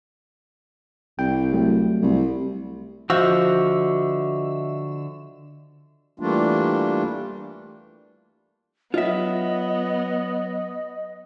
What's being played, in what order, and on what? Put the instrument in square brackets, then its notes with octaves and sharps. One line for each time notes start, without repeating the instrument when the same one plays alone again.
[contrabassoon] C2 [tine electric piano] G5
[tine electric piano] F#3 A3
[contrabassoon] C2
[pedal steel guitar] D3 E6 [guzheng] F3 [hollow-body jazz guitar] F#4 [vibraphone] D#5 E5 C#6
[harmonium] E3 G3 A3 A#3 D4 F4
[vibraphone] F#3 C#5 [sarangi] B3 [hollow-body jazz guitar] F4 E5 [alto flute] D#5